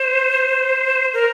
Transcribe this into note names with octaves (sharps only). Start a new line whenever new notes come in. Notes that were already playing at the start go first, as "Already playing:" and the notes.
Already playing: C5
A#4